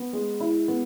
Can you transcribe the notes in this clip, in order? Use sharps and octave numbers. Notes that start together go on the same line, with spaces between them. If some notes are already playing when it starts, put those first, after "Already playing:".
Already playing: B3
G#3
E4
B3